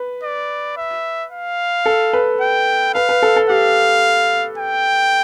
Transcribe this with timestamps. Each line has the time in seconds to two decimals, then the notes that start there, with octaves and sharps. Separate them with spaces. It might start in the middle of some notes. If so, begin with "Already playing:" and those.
Already playing: B4
0.23 D5
0.77 E5
1.32 F5
1.86 A4
2.13 B4
2.41 G5
2.95 B4 F5
3.09 B4
3.22 A4
3.36 A4
3.50 G4 F5
4.58 G5